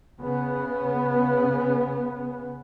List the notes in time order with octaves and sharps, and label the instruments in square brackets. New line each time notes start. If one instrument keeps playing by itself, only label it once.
[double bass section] C#3 B3